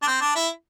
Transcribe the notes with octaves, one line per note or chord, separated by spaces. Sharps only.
D4
C4
D4
E4